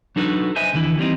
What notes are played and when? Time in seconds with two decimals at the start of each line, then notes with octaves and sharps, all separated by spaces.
0.16 F#3 D4 D#4 F#4 A4 B4
0.56 C5 D#5 E5 G#5
0.74 D#2 D3 E3 E4
0.97 E3 G3 C4 D#4